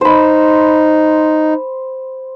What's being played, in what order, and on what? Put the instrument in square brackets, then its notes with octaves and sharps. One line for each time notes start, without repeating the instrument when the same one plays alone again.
[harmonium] D#4 [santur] C5 B5